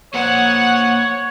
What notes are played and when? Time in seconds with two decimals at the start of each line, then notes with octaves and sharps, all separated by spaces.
0.14 A#3 C5 C#5 F#5